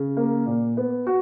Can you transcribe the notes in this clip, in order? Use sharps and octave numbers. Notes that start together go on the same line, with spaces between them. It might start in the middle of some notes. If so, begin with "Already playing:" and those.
Already playing: C#3
A#3
A#2
B3
F#4